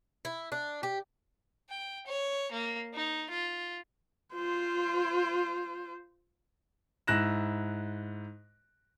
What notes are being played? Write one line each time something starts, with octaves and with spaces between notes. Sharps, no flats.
E4
D4
G4
G5
C#5
A#3
D#4
F4
F4 C5
G#2 E4 F#6 A#6 E7